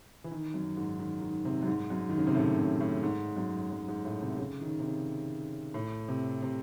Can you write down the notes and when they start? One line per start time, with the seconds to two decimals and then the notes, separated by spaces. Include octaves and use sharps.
0.24 E3
0.31 D#3
0.54 F#2
0.77 G#2
0.99 D#3
1.22 D#3
1.45 C3
1.63 F#2
1.67 G#2
1.90 F#2
2.09 D#3
2.18 C#3
2.27 C3
2.35 A2
2.58 C3
2.81 A2
3.03 G#2
3.37 F#2
3.70 F#2
3.88 G#2
4.05 A2
4.22 C3
4.39 C#3
4.61 D#3
4.80 C3
4.85 C#3
5.74 A2
6.08 C3
6.42 C3